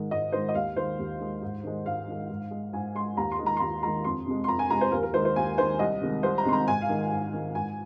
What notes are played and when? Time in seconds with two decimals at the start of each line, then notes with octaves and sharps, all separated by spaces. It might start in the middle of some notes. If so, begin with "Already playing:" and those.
Already playing: G#2 D#3 G#3
0.11 G#2 D#5
0.32 D#3 G#3 C5
0.49 D#5
0.55 D#2 F5
0.76 D#3 G#3 C5
0.99 D#2
1.20 D#3 G#3
1.42 G#2
1.63 D#3 G#3
1.86 G#2 F5
2.08 D#3 G#3
2.30 G#2
2.51 G#3
2.73 G#2 G#5
2.95 G#3 C6
3.17 D#2 A#5
3.31 C6
3.39 D#3 G#3
3.46 A#5
3.57 C6
3.60 D#2 A#5
3.83 D#3 G#3 A#5
4.04 F2 C6
4.26 C3 G#3
4.44 C6
4.48 F2 A#5
4.59 G#5
4.70 C3 G#3 A#5
4.81 C5
4.92 D#2 A#4
5.03 A#4
5.14 D#3 G#3 C5
5.25 C5
5.36 D#2 G#5
5.58 D#3 G#3 C5
5.79 C2 D#5
6.01 C3 D#3 G#3
6.23 C2 C5
6.38 A#5
6.45 C3 D#3 G#3 C6
6.53 A#5
6.67 G#2 G#5
6.82 F5
6.89 D#3 G#3
7.11 G#2
7.33 D#3 G#3
7.55 G#2 G#5